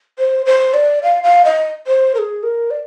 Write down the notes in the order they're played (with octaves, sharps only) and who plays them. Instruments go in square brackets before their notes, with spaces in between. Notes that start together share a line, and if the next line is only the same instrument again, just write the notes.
[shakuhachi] C5
C5
D5
F5
F5
D#5
C5
A#4
G#4
A#4
D5